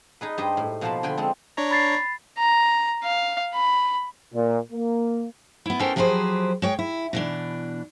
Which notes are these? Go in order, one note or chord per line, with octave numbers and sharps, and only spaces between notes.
D#4 G#4 B4
G2 G4 C5 D#5
A2
B2 F3 A#3 C5 A5 B5
D3 G5 G#5 B5 C6
G#3 C4 A4
D4 C#5 A#5
B5 A6 C7
A#5
F5
B5
A#2
A#3
B3 E4
B3 C#4 A4 A#4 C5 G5
F3 F#3 G4 G#4 B4 C5
G#3 C#5 G5
E4
B2 E3 D4